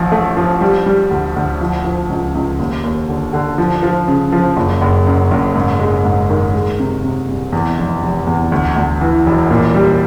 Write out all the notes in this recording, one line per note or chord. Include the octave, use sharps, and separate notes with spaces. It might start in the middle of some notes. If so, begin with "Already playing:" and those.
Already playing: A1 F3
A3
F3
G3
G3
D2
D2
F3
F3
C#2
C#2
D#2
D#2
D3
D3
F3
F3
C#3
F3
F#1
F#1
F#2
F#1
G#2
G#3
G#2
D#3
G#3
C3
C3
C2
E2
F1
F1
E2
D2
D2
E3
E1
A#2
G3